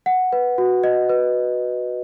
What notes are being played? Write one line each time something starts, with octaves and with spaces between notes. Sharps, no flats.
F#5
B4
F#4
D#5
B4